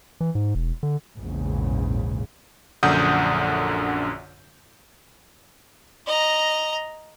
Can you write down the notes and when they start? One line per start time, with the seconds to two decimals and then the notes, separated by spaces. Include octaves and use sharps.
0.20 E3
0.35 G#2
0.55 E1
0.83 D3
1.17 A#1 E2 G#2 C#3
2.83 A#1 F#2 D3 F#5 D#6 G6
6.07 D#5 A#5